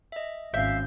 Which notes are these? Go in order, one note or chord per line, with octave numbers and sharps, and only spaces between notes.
D#5 E5
G#1 C#4 E5 F5 G6